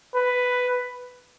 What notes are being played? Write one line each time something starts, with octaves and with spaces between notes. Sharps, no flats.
B4